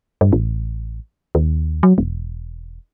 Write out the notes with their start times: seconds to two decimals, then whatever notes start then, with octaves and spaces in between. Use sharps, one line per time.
0.21 G2
0.33 A1
1.35 D#2
1.83 F#3
1.98 E1